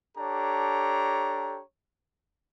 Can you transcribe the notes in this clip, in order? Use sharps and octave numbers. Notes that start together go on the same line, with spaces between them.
D4 G4 A4 C#5 A#5